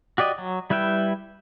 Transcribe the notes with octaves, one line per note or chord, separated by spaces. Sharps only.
F#4 G4 D5 D#5
F#3
G3 E4 B4 E5 G5